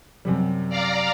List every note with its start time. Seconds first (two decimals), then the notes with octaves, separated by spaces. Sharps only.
0.25 F#2 C3 G3
0.69 D5 F5 A#5